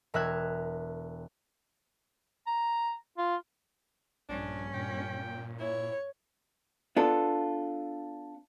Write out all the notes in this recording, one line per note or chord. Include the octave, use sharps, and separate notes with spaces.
E1 A#4 E5 F#6 G#6
A#5
F4
A#1 G2 C#4 D4
A#2 G5
E4 C#5
B3 D4 F4 A4